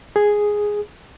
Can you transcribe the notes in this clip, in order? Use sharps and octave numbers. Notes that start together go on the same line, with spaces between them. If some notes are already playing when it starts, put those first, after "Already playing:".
G#4